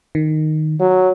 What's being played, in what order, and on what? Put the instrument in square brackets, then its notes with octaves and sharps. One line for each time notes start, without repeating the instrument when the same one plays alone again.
[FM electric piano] D#3
[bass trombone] F#3